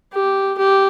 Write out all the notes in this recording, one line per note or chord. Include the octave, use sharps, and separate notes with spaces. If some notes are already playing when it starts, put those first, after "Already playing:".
G4
G4